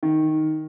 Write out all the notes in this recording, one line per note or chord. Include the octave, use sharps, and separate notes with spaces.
D#3